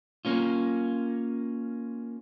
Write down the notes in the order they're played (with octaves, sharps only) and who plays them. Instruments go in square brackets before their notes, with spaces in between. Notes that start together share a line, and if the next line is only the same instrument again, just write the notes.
[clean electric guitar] A#3 C#4 F4